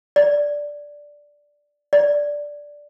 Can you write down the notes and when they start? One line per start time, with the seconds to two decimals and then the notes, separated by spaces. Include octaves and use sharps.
0.16 D5
1.93 D5